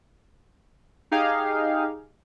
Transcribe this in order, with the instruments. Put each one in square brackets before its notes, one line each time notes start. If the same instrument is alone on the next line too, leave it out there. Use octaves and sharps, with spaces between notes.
[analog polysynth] D#4 G4 G#4 F5